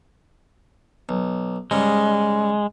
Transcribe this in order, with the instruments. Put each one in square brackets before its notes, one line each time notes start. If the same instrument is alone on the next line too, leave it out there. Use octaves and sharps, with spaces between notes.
[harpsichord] B1
[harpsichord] G#2 C#3 G3 [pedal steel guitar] G#3